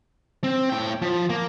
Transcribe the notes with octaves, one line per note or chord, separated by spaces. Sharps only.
C4
A2 G5
F3
A#3